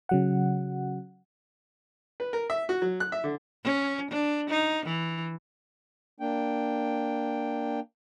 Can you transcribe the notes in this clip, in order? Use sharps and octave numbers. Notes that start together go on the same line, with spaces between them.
C#3 F#3 F#5
B4
A#4
E5
F#4
F#3
F#6
E5
D3
C#4
D4
D#4
E3
A#3 D4 G5